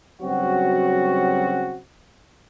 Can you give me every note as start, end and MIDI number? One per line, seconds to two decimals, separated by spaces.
0.22 1.79 43
0.22 1.79 49
0.22 1.79 54
0.22 1.79 60
0.22 1.79 66